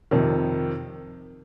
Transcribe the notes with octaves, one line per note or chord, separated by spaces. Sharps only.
F2 C3 D#3